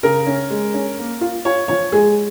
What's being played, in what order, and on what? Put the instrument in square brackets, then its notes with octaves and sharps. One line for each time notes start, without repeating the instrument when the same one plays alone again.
[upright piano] C#3 A#4
C#4
G#3
C#4
A#3
F4
F4 C#5
F3 C#5
G#3 G#4